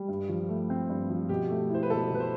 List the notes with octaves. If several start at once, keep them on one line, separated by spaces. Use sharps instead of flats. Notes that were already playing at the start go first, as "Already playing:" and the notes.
Already playing: G3
G2
F3
A3
C4
G2
F3
B2 G4
A3
E4 C5
B4
B2 A4
B2 B4
C5